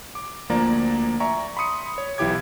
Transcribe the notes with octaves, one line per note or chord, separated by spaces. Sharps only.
D6
D2 F3 A#3 D5 A#5
D5 E5 G#5 A#5 C#6
B5 C6 D#6 C#7
C#5
B1 E3 E4 G4 D6 G#6